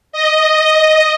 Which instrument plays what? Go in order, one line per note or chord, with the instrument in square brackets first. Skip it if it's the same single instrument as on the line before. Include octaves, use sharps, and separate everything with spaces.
[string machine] D#5